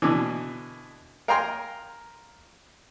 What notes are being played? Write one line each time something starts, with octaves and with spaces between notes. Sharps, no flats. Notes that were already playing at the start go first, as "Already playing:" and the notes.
B2 D3 E3
A#4 F5 G5 G#5 A#5 C6